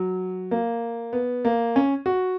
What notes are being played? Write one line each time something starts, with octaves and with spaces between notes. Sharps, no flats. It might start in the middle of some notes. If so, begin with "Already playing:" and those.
Already playing: F#3
A#3
B3
A#3
C#4
F#4